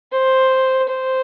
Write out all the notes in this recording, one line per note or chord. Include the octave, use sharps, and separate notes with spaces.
C5
C5